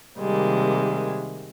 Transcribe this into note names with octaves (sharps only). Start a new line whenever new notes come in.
C3 D#3 G3 G#3 A#3